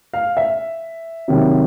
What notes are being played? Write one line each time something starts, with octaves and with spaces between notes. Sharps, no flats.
F5
E5
C3 D#3 F#3 A#3